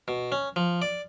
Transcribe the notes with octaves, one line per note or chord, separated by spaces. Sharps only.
B2
C#4
F3
D5